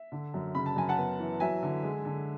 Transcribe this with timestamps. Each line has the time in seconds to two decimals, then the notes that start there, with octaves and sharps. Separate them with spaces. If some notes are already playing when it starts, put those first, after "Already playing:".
Already playing: E5
0.12 D3
0.34 F#2
0.55 C#3 B5
0.66 A5
0.76 F#2 G#5
0.89 F#5 A5
0.98 B3
1.19 E3
1.40 F#3 E5 G#5
1.63 D3
1.84 G#3
2.05 D3